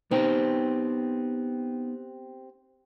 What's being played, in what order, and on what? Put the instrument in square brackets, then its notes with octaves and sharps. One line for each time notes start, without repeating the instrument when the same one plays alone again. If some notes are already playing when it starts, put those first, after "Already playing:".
[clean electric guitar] B3 D#4 G5 [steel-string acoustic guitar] C4 G4